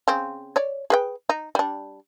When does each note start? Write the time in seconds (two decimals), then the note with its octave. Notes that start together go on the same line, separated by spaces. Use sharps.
0.08 C#3 C4
0.56 C#5 D5
0.90 G#4 B4 G5
1.29 D#4
1.55 G3 D4